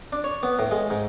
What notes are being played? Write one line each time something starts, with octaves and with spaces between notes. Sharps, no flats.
D4
C#5
B3
A2
G#3
G#2